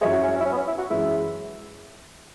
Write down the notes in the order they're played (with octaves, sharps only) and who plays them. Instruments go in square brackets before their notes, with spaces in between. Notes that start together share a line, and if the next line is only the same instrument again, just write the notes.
[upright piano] F#2 F#3 E4 C#5 E5 [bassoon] G#3
[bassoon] F#4
C#4
C#4
E4
C#4
B3
C#4
E4
F#4
[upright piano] F#2 E3 G#3 [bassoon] E4